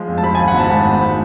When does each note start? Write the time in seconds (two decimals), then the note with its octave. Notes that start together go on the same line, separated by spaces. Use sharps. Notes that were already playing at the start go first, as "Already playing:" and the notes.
Already playing: F3 G#3
0.08 F2
0.18 A5
0.23 F3 B5
0.35 G#5
0.40 G#1
0.48 F#5
0.54 G#2 A5
0.70 G#1 B5
0.87 G#2